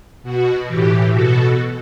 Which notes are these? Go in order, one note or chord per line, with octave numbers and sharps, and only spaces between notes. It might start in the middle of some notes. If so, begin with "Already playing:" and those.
B2 F#4
A2 E3 G4
B2 F#4 A4